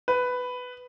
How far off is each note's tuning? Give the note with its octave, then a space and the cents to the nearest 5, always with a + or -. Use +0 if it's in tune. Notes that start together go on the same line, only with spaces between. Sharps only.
B4 +10